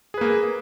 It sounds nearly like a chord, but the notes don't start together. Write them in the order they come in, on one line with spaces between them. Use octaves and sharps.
G#4 B4 A#3